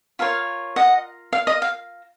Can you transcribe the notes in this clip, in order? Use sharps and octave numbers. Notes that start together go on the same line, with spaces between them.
F4 A#4 C#5 F5
D#5 F#5
F5
D#5
F5